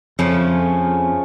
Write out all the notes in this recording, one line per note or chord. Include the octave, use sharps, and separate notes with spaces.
F2 C#3 F3 A3 C#4